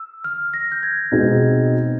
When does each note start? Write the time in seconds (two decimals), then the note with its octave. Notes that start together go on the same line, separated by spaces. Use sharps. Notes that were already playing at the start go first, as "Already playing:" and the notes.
Already playing: E6
0.24 F6
0.54 A#6
0.72 G6
0.83 G#6
1.12 B2 G#3 C4 D#4